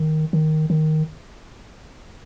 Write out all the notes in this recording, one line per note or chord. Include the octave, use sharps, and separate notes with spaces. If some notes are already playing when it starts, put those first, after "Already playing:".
Already playing: D#3
D#3
D#3